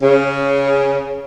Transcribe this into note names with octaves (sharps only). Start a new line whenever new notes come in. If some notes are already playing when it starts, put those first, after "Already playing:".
C#3